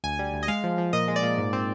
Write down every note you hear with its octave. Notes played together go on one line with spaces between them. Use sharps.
D2 G#5
G3
D2
D#5
G#3 F5
F3
F3
A#2 D#5
G#3
D5
A#2
G#2
C4